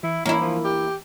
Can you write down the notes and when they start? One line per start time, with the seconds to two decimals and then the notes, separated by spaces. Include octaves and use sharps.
0.03 E3 E4
0.26 E3 A#3 C#4 E4
0.40 F3
0.64 G4